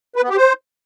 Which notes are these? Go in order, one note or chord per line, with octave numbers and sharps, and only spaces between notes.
B4
B3
G4
C5